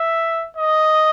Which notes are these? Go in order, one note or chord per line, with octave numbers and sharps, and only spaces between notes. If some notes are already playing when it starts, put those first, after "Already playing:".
Already playing: E5
D#5